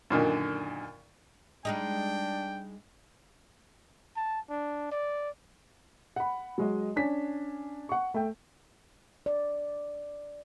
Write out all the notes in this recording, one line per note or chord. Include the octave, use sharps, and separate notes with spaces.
F#2 A#2 D3 D#3
G3 G#3 D4 D#4 G5
A5
D4
D5
F#5 B5
F#3 G#3 D#5
C#4 D4 G#5 B6
F#5 C#6
A3 G5
D5